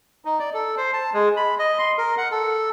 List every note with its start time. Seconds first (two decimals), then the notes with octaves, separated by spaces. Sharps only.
0.25 D#4
0.40 D5
0.54 A4
0.77 C5
0.93 A5
1.14 G#3
1.37 B5
1.59 D#5
1.78 C6
1.98 A#4
2.18 F#5
2.31 A4